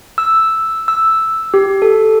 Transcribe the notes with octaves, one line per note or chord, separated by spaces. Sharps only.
E6
E6
G4
A4